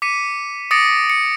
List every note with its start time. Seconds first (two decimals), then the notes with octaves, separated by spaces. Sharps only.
0.02 D6 B6 C#7 D#7
0.71 D6 D#6 A6 A#6 C#7 D7
1.10 C#7